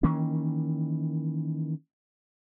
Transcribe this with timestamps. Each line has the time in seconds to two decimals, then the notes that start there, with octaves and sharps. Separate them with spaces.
0.03 D#3 E3 A#3 C#4